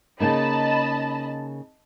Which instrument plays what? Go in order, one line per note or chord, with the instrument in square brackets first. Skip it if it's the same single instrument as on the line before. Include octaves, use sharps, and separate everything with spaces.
[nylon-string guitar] C#3 A#3 D#4 [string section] D#5 A5 B5